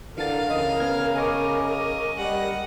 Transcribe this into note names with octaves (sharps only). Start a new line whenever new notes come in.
D3 E3 A#4 F5 A5 A6
C#2 C#3 D#5 D#6
B3 F6 G#6
D#5 G#5 C#6 D6
G3 D#5 F#5